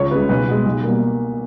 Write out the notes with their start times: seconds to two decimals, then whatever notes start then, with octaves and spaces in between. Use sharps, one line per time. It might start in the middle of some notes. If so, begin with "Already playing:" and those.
Already playing: C#2 C#5
0.11 C#3 G#3 B4
0.29 B1 B4
0.48 B2 G#3
0.66 B1
0.84 B2 G3 A#3